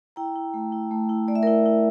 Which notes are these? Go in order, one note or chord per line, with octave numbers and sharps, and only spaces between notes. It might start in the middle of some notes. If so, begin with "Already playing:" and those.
E4 G5 A#5
E4
A3
E4
A3
E4
A3 D5
E5
E4 A#4 D5
E4